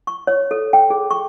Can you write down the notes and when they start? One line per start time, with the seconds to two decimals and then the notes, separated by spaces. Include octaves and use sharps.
0.07 C#6
0.27 C#5
0.51 A4
0.73 G5
0.90 G#4
1.11 C#6